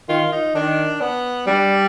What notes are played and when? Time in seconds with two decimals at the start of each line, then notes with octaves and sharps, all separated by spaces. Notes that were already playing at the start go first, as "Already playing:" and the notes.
0.09 D#3 F4
0.32 D#4
0.55 D#3 D4
1.01 B3
1.47 G3 D4